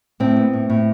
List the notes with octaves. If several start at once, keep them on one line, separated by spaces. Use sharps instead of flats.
A2 C4
B3
A2
A2